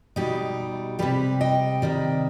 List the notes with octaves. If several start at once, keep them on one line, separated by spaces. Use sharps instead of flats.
B2 G3 D#4 G4
C3 G3 G4 B4
D#5 G5
C3 D#3 G3